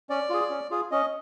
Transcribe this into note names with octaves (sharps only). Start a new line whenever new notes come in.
C#4 D5
F4 G#4
C#4
F4 G#4
C#4 D#5